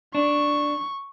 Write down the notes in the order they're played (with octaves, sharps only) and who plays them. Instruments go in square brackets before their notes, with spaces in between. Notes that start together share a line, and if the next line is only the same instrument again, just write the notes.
[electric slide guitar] D4 [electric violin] C#6